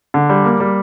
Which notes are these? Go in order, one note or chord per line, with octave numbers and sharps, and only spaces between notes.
D3
G3
A#3
G3